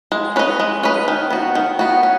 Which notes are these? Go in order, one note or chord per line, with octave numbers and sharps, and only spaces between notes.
G#3
C#4 B4 D#5
G#3
C#4 B4 D#5
D#3
B3 F#4
D#3
B3 F#4
C#4